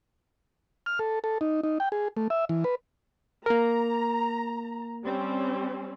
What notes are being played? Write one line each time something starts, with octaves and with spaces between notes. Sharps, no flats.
F6
A4
A4
D#4
D#4
G5
G#4
A3
E5
E3
B4
A#3 A#4 A#5
G3 C4 C#4